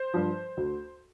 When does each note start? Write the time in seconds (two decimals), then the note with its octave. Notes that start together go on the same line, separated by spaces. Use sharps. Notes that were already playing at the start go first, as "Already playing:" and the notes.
Already playing: C5
0.14 G2 F3
0.57 D2